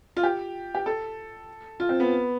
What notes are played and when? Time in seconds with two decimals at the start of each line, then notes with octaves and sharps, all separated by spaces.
0.17 F4
0.23 G4
0.75 G4
0.86 A4
1.80 F4
1.89 C4
2.00 B3